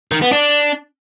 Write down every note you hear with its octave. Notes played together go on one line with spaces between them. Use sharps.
D#3
B3
D4